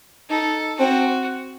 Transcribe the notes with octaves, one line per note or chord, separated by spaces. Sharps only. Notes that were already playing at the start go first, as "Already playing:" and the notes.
D#4 A4
C4 F#4